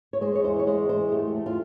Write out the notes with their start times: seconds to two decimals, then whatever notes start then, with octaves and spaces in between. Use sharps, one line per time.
0.13 C#5
0.21 G#3 C5
0.35 C#5
0.44 E2 C5
0.59 C#5
0.67 G#3 C5
0.89 E2 C5
1.12 A3 G4
1.35 A3
1.46 F4